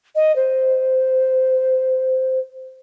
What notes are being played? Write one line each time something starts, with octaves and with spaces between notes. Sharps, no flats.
D#5
C5